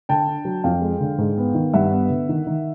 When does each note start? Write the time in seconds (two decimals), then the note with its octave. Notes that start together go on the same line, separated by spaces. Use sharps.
0.09 D3 G5 A5
0.27 D4
0.45 F#3
0.64 F2 F5 G5
0.81 G#3
1.01 D3
1.18 G#2
1.37 B3
1.55 D#3
1.74 G2 E5 F#5
1.92 B3
2.10 D3
2.29 D#3
2.47 D#3